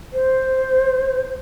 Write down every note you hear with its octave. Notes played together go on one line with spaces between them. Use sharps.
C5